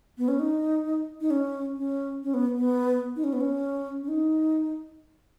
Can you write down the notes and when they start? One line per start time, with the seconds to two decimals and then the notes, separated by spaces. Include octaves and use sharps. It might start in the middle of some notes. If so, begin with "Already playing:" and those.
0.18 B3
0.28 C#4
0.39 D#4
1.21 D#4
1.31 C#4
1.77 C#4
2.23 C#4
2.34 B3
2.56 B3
3.16 D#4
3.24 C#4
3.33 B3
3.41 C#4
4.03 C#4
4.08 D#4